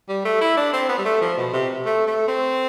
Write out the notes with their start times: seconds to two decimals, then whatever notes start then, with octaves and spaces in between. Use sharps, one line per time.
0.08 G3
0.25 A3
0.41 E4
0.57 D4
0.73 C4
0.89 B3
0.98 G3
1.05 A3
1.21 F3
1.37 B2
1.53 C3
1.85 A3
2.06 A3
2.28 C4